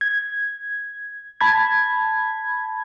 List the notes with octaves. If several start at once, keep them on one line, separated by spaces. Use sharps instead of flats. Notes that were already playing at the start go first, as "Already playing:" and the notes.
G#6
A5 B5 G#6